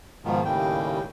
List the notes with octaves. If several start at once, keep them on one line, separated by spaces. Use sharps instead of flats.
G#2 B2 D#3 F3
D#2 A2 C#3 G3 G5